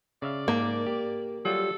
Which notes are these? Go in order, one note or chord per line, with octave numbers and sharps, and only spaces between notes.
C#3 D5 E5 F5
G#2 A#3
G4
F#3 G3 F4 A4